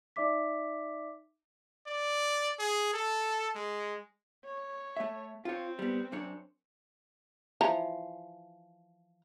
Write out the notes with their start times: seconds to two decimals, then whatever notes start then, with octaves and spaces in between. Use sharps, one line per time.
0.16 D#4 D5 E5 D6 B6
1.87 D5
2.59 G#4
2.94 A4
3.55 G#3
4.44 C#5
4.97 A3 E5
5.45 C4 F4 C#5
5.79 G3 B3
6.12 F#2 D4 C#5
7.61 E3 F3 A#5